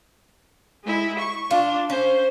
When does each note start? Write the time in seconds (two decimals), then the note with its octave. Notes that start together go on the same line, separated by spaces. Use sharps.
0.84 G#3 E4
1.19 C#6
1.51 D4 F4
1.90 C#4 C5